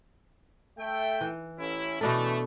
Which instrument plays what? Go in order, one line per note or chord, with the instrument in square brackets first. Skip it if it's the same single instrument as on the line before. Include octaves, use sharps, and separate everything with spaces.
[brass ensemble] A3 E5 G5
[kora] E3
[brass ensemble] A1 C#4 E4
[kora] B2 D4 A4 [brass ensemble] E3 A3